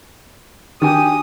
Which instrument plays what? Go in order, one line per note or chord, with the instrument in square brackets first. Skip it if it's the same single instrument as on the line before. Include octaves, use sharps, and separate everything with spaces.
[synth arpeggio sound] D#3 [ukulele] D4 F#4 G#5 [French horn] G4 [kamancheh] D#6